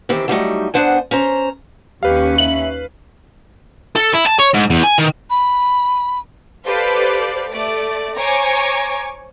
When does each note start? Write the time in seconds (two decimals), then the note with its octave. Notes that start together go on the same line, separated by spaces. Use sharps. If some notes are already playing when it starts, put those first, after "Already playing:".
0.09 D#3 E3 C4 G4
0.28 F#3 G3 A3 D#4
0.74 B3 D4 C5 F#5 G#5
1.11 C#4 C5 A#5
2.03 D#2 C#4 G4 B4 F5
2.38 E5 F#7
3.96 A4
4.15 E4
4.27 A5
4.40 C#5
4.54 G#2
4.70 E2
4.83 G#5
4.98 D#3
5.30 B5
6.66 G4 A4 B4 C5 D5 F5
7.49 A3 D5
8.17 C5 C#5 G#5 A#5 C#6 D6